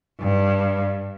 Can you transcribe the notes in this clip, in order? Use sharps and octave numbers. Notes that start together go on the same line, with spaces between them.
G2